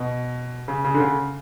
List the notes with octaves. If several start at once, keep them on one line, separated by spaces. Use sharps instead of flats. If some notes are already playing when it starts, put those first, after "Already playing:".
Already playing: B2
C#3
C#3
D3
C#3